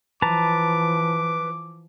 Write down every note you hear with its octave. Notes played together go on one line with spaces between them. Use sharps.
E3 F3 B4 A5 A#5 D6